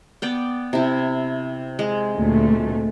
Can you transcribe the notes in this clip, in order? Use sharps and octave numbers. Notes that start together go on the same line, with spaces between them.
B3 D5 G5
C3 E4
G#3
D2 A#2 A3